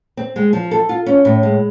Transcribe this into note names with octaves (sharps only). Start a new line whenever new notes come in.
C4
G#3
F3
A4
F4
C#4
A2
G#3